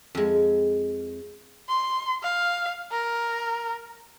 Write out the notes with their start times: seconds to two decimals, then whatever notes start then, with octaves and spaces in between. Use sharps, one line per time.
0.15 F2 G#3
1.69 C6
2.23 F5
2.92 A#4